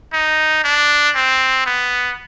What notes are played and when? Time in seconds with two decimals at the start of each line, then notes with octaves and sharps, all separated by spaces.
0.13 D#4
0.64 D4
1.15 C4
1.66 B3